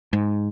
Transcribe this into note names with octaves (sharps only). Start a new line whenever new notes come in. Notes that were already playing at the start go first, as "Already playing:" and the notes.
G#2